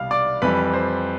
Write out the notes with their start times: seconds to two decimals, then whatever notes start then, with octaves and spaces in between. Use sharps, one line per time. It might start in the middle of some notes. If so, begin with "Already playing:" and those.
Already playing: C2 B2 G3 F5 F6
0.11 D5 D6
0.42 F2 E3 G3 B4 B5
0.73 C5